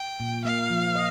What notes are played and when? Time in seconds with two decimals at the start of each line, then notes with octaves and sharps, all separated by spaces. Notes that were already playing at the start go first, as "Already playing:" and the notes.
Already playing: G5
0.20 A#2
0.44 A#3 F5
0.70 F3
0.95 D#5